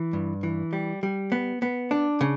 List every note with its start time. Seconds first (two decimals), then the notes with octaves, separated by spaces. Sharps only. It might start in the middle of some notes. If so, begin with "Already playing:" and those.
Already playing: E3
0.13 G2
0.43 E3
0.73 G3
1.03 G3
1.32 B3
1.62 B3
1.91 D4
2.21 C#3